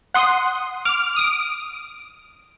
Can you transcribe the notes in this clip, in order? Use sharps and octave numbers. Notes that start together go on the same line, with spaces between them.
F#5 C6 D#6
D6 F6
D#6 D7